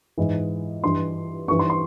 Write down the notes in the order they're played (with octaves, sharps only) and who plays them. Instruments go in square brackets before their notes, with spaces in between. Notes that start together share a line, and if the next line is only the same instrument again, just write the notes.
[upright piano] G#2 E3
G2 E3 C6
G2 E3 C#6
C6
C6